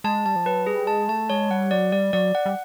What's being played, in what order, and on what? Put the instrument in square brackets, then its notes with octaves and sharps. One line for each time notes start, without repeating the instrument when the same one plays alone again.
[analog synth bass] G#3 [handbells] A5
[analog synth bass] G3 [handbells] A5
[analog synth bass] F3
[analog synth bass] F#3 [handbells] B4
[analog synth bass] G3 [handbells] G#4
[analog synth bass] G#3 [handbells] A5
[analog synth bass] A3 [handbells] A5
[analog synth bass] G#3 [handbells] C#5
[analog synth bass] G3 [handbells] F#5
[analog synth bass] F#3 [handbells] D5
[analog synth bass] G3 [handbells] D5
[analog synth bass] F#3 [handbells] D5
[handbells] F#5
[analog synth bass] G3